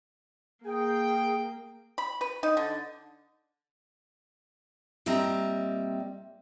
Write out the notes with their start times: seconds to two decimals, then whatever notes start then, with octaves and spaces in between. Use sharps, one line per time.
0.65 A#3 G#4 G5
1.98 B5
2.21 B4
2.43 D#4
2.57 D3
5.06 A#2 G3 C4 D#5 E5 A#5